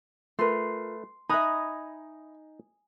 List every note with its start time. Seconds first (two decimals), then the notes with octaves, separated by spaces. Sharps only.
0.39 A3 F4 A#4 B4 C6
1.29 D#4 D#5 E5 G#5 A#5 B5 D#6 F#6